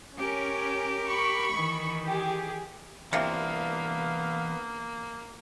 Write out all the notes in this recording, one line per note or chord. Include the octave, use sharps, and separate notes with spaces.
C#4 G4 A#4
B5 C#6
D#3 E3
G4 G#4
C3 E3 F3 A#3 B3 D4 F5